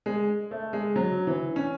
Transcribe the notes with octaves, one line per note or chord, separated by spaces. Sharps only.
G#3
A3
G#3
F#3
E3
C#4